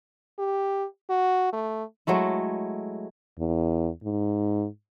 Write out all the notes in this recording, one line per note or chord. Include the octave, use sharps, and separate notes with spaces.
G4
F#4
A3
F#3 G#3 A3 E4
E2
G#2